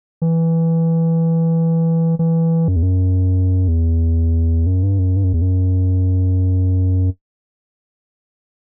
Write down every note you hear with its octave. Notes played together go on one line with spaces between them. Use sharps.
E3
E3
F#2
E2
F#2
E2
F#2
G2
F#2
G2
F#2
E2
F#2